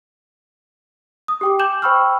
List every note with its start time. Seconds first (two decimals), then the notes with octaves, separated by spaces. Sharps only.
1.28 D#6
1.41 G4 G5 D6
1.59 G#5 D6 G6 E7 F#7
1.82 C5 G5 B5 C#6 E6 F6